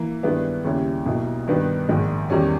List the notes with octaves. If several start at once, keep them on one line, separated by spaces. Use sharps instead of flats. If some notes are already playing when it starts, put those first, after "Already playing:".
Already playing: E3 A#3
G2 D#3 G#3 B3 E4
D#2 C#3 G3 C#4 E4
B1 B2 A#3 E4
G2 D#3 G3 B3 D#4
A#1 G#2 D#3
E2 D#3 G3 C#4